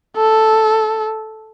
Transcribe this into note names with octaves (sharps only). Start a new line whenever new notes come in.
A4